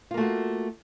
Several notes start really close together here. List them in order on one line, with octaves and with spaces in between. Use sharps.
F4 A#3 A3 F#4